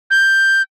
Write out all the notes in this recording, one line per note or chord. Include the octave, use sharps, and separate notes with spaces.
G6